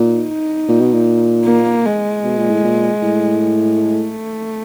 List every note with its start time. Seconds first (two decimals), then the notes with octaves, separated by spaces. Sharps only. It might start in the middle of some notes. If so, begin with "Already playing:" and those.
Already playing: A#2 D#4
0.68 A#2
0.81 B2
0.94 A#2
1.46 A#3
1.85 G#3
2.24 B2
2.38 A#2
2.50 A2
2.64 A#2
3.02 A2
3.79 A3